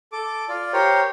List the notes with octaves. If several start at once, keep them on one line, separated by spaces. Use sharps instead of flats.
A4 D6
F4 D5
G4 A#4 C5 C#5